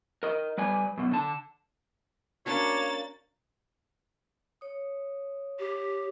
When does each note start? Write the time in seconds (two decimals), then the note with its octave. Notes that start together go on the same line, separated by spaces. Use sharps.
0.23 A#4 D#5
0.58 G3 B4 D5 G#5
0.97 F#2 B2
1.11 D3 A5
2.46 A#3 C#4 D4 F#4 C#5 A6
4.61 C#5 D#6
5.59 G4